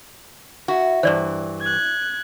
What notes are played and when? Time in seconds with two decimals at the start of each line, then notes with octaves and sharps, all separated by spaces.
0.68 E4 F#4 E5 F#5
1.03 G2 E3 C5 D5
1.61 F#6 G#6